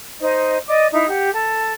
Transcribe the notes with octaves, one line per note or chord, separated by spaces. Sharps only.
D#4 C5 D#5
D5 D#5 D6
D#4 E4 E5
G4 F#5
A4